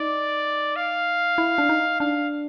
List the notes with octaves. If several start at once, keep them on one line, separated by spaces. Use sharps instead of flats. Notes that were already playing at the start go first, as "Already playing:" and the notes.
Already playing: D#4 D5
F5
E4
D4
D#4
D4 F5